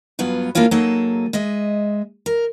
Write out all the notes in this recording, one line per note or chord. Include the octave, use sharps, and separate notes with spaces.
G2 F#3 B3 F4
A#3 D4 E4 F4 C#5
F#3 A#3 D#4 G#4 A4
G#3 D#5 E5
A#4